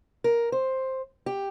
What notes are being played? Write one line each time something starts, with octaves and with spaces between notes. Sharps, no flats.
A#4
C5
G4